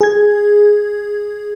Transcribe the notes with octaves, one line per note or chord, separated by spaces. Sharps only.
G#4 G#6